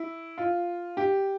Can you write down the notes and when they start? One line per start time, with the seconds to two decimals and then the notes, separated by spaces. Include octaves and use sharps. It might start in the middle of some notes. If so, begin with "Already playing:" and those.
Already playing: E4
0.38 F4
0.97 G4